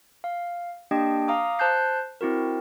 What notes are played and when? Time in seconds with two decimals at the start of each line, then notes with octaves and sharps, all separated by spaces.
0.24 F5
0.91 A#3 D4 G4 D#5 G5
1.28 F5 A#5 D6 D#6
1.59 C5 A5 F#6 G6 C7
2.21 C4 E4 F#4 A#4